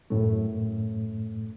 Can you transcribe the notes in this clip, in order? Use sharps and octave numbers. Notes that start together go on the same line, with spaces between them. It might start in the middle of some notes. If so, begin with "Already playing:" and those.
F#2 A2 A3